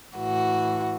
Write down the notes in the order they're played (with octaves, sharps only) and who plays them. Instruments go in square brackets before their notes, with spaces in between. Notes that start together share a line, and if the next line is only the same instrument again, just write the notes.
[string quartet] A2 E3 F#4